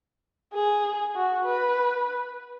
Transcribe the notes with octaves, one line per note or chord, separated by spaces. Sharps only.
G#4
F#4
B4